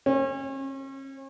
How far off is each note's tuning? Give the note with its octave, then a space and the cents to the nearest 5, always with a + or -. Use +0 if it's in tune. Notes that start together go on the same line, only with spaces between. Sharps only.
C#4 -40